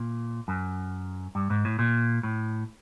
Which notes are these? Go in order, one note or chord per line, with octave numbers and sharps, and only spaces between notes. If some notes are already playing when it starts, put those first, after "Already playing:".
Already playing: A#2
F#2
G2
G#2
A2
A#2
A2